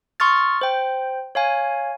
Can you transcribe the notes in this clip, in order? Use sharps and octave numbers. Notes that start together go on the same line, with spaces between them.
C6 C#6 D#6 F6 A6
C5 G5
C#5 F5 G#5